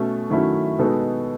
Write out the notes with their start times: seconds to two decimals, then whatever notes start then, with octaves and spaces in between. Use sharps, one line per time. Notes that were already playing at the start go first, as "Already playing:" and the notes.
Already playing: B2 A3 C#4
0.30 D#3 F#3 A3 C#4 E4
0.78 B2 G#3 B3 D#4 A4